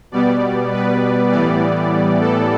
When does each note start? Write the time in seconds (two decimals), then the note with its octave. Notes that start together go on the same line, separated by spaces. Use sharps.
0.11 B2 G3 B3 D5
0.72 B4
1.31 A2 E3 G3 B3 D5
2.20 A4